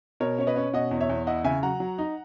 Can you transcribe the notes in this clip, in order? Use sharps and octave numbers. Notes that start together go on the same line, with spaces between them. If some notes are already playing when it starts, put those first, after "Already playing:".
B2 A#4 C#5
C#4 C#5
B4 D#5
C#4
B2 D#5 F#5
E2
C#5 E5
E2
E4 D#5 F#5
C#3 E5 G#5
F#3 F#5 A#5
F#3
D#4